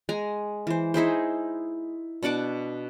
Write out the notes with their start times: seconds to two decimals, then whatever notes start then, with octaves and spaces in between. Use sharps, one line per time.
0.09 G#3 G#5 A#5
0.67 E3 C5
0.94 D#4 E4 G#4 C5
2.23 B2 D4 F#5 D6